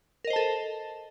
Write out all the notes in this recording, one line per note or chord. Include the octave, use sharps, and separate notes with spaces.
A4 A#4 C5 D#5 A5